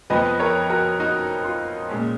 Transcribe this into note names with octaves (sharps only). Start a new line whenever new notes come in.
F2 F3 B3 B4 D#5
A#4 C#5
F#4 A#4
D#4 F#4
F4
A#2 G#3 C#4